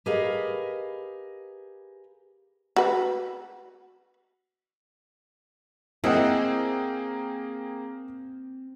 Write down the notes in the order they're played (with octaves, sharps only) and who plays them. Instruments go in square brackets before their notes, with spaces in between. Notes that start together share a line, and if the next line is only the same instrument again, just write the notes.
[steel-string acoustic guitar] G4 G#4 A#4 B4 D#5 F5
[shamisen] F#4 B4
[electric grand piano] A#3 G#4 G5 [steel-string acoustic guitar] C4 [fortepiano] E4 D#5 F#5